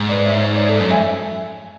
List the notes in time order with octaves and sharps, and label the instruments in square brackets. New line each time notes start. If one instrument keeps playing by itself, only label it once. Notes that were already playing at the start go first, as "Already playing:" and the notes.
Already playing: [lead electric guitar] G#2
[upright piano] B4 D5
C#5 E5
C#5
D5
A4 C#5
[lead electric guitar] F#2
[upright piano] E5 G#5